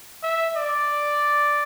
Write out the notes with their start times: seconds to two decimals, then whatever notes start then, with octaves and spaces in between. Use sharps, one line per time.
0.23 E5
0.56 D5